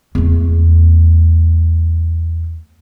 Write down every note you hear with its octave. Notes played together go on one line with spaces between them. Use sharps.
E2 A3